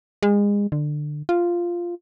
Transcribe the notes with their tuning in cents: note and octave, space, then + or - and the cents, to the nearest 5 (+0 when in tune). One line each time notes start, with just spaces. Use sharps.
G#3 -30
D3 +20
F4 -5